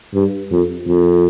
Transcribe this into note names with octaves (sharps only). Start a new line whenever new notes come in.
G2
F2
F2